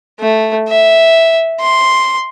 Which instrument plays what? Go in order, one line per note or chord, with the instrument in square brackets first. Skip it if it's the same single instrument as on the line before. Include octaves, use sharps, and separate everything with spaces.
[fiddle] A3
E5
C6